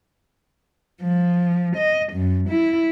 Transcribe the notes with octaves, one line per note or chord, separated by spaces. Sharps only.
F3
D#5
F#2
E4